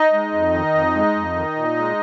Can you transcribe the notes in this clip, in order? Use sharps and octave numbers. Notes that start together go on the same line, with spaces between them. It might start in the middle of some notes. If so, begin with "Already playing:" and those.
Already playing: D#4 D#5
G#3
F2
D#3
F2
G#3
F2
D#3
A#2
G#3